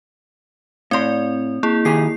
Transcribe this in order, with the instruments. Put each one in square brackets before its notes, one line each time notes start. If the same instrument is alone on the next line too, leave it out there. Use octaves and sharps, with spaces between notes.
[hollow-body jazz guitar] A2 C6 [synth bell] C4 D5
[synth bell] A#3 E4 G#4
[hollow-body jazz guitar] D#3 G4 G#4 [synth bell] C7